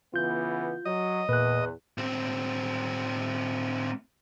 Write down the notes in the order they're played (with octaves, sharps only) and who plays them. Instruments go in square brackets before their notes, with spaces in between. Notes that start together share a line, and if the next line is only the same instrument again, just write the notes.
[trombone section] C#3 E3 B3 [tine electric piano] F4 G6
[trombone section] F#3 [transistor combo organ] D#5
[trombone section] E2 [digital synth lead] A#2 [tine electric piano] B4 F#6
[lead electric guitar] A2 C4